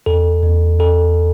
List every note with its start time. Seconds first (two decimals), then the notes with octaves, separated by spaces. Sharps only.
0.06 E2 A4
0.43 E2
0.80 E2 A4